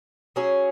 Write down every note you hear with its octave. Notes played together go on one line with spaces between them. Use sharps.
F#3 C#4 G#4